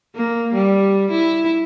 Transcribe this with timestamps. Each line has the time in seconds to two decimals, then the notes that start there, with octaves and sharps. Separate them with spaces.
0.16 A#3
0.54 G3
1.11 E4